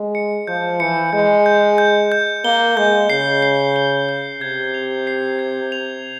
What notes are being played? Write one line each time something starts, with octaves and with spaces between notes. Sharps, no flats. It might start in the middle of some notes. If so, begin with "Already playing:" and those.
Already playing: G#3
C#7
F3 G6
E3 C#7
G#3 G6
G6
G6
G6
A#3 G7
G#3 G6
C#3 C7
C7
G7
G6
C3 G#6
F7
C7
G#6
F7